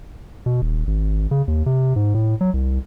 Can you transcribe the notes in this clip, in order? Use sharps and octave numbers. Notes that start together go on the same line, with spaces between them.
B2
D#1
G#1
C#3
D#2
C3
G#2
A2
F#3
C2